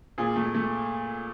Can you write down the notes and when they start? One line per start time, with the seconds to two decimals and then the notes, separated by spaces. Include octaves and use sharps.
0.18 A#2 G#4
0.36 A3
0.54 A3